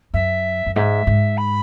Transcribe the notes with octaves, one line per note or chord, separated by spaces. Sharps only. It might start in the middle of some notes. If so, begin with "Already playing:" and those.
F#2 E5
F#2
G#2 E5
G#2
B5